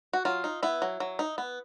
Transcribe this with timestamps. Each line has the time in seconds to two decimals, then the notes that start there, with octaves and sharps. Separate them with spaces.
0.13 F#4
0.25 F#3 F4
0.44 D#4
0.63 B3 E4
0.82 F#3
1.00 F#3
1.19 D#4
1.38 B3